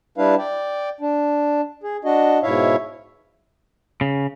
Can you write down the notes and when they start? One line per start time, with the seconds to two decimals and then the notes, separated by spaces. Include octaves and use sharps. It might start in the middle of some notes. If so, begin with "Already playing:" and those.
0.18 G3 D4 E4 B4 F5
0.38 D5 G5
1.00 D4
1.83 G#4
2.05 D4 F#4 D#5
2.43 G#2 B2 E4 C#5 E5 F5
4.01 C#3